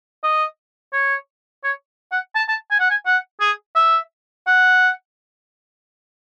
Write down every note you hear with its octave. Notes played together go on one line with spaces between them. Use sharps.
D#5
C#5
C#5
F#5
A5
A5
G#5
F#5
G#5
F#5
G#4
E5
F#5